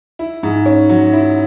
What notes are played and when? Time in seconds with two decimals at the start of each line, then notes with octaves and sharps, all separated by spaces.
0.19 E4
0.43 G#2
0.66 C#4
0.89 F#3
1.13 E4